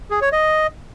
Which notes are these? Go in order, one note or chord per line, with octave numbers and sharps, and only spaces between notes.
G#4
C#5
D#5